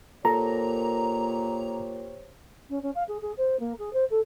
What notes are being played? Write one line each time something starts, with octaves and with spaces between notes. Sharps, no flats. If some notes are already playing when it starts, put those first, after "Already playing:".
A#2 A#3 G4 A4 A#4 C5 C#5 A#5
C#4
C#4
F5
G#4
G#4
C5
A#3
G#4
C5
A4